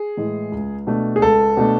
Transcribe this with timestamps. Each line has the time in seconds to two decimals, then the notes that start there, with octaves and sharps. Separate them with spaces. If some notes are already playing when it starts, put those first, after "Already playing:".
Already playing: G#4
0.17 A2 E3 G#3
0.52 C#2
0.87 B2 A3 D4
1.16 G#4
1.22 C#2 A4
1.57 B2 A3 D4